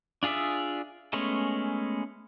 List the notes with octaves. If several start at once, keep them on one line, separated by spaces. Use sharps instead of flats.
D4 F4 G#4 D5 E5
G#3 A3 B3 C#4